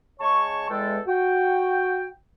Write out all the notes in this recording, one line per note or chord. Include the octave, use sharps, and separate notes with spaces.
C#3 G#3 C#5 A5 C#6
E2 G#3 A4 G5
F#4 G5